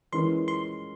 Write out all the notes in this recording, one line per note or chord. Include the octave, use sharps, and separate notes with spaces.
E3 G#3 C#4 F4 A#4 C6
C6